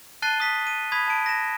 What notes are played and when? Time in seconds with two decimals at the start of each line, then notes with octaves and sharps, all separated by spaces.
0.22 A5 F#6 A6 C7 D#7 G7
0.40 D#6 B6
0.67 D#7
0.92 B5 D#6 G#6 B6
1.08 A5 D7
1.26 A#6 E7